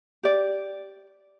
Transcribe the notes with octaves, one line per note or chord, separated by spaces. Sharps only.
G4 D5